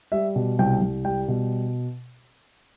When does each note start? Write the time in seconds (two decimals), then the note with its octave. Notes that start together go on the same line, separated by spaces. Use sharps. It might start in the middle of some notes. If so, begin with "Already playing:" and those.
0.12 G3 E5
0.36 B2
0.59 C2 G5
0.82 C2
1.05 G3 G5
1.28 B2